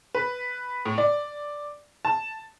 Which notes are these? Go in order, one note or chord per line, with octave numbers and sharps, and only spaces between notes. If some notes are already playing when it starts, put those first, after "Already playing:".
B4
A2
D5
A5